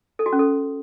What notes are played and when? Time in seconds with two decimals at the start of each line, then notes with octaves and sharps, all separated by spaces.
0.19 A4
0.26 F#4
0.33 C#4
0.39 A4